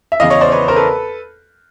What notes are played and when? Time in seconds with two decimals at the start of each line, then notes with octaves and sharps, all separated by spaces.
0.12 E5
0.20 E2 C#3 E3 D#5 F5
0.30 C#5 D#5
0.41 C5 D5
0.52 B4 C#5
0.68 A#4 C5
0.76 A4 B4